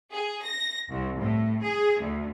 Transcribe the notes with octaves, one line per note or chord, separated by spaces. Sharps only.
G#4
A#6
C2
A2
G#4
D2